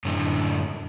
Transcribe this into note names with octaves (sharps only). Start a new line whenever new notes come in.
F#2 A2 D3 A3